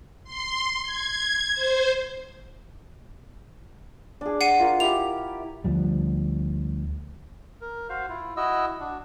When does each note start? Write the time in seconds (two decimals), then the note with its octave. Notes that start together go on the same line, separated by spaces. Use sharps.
0.24 C6
0.82 G#6
1.54 C5
4.21 D4 G#4
4.41 F#5 C7 D#7
4.59 F4 A#4 C#6
4.80 E4 G4 F7
5.64 D2 F3 G3
7.61 A#4
7.89 F#4 C5 F5
8.09 E4 F4
8.37 E4 F#4 D#5 E6
8.80 D4 F#4